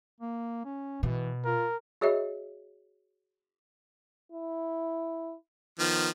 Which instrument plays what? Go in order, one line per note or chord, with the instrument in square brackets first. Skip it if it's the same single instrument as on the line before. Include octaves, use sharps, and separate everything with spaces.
[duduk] A#3
C#4
[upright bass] B2 [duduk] E3
[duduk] F4 [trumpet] A#4
[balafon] F#4 G#4 C#5 D#5 E5
[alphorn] E4
[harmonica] D#3 F3 [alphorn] B3